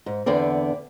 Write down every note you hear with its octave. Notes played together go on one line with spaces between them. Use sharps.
G#2
E2 D3 B3 C4 D5